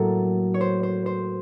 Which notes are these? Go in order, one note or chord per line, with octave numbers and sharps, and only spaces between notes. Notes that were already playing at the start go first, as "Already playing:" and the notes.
Already playing: A2 F#3 A#3 A4
C#5
C5
C5
C5